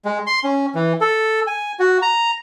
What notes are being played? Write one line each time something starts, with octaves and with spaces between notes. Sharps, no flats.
G#3
C6
C#4
E3
A4
G#5
F#4
A#5